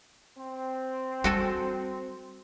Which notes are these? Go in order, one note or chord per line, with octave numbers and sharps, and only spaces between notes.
C4
G3 F#4 A4 G#5